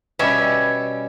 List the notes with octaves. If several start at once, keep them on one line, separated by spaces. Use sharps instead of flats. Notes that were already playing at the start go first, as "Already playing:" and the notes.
B2 G3 C#4 E5